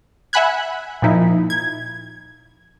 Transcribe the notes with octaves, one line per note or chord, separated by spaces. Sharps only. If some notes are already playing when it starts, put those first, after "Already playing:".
E5 F#5 G#5 B5 F#6 G#6
A#2 F3 D#4 E4
G#6